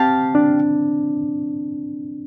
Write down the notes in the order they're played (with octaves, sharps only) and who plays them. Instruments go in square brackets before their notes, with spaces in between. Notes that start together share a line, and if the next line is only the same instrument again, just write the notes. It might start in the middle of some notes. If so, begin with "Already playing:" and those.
Already playing: [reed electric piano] C4 [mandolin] G4 F5 A5
[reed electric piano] D4